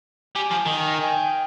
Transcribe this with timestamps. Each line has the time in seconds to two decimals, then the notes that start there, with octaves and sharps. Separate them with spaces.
0.35 G3 G#5
0.51 F3 G#5
0.66 D#3 A#5
0.81 G#5
0.95 G5
1.04 G#5
1.10 G5